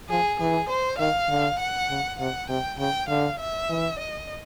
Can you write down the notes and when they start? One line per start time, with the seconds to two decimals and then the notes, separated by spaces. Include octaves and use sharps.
0.09 F3 G#4
0.40 E3 G#4
0.69 C5
0.99 D#3 F5
1.29 D3
1.59 F#5
1.90 C#3
2.19 C3 F#5
2.49 C3 G5
2.79 C#3 G5
3.08 D3 F5
3.39 E5
3.69 E3
3.99 D#5